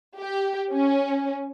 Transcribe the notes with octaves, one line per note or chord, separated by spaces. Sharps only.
G4
C#4